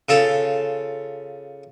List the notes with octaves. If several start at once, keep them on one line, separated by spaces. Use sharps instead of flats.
C#3 F4 A4